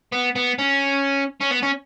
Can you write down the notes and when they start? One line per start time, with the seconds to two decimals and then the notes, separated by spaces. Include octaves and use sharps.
0.12 B3
0.36 B3
0.58 C#4
1.41 C#4
1.51 B3
1.62 C#4